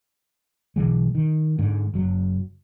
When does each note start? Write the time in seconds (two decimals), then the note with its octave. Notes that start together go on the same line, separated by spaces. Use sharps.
0.76 B1 D3 E3 G#3
1.15 D#3
1.59 G#2 D3
1.94 F#1 F#3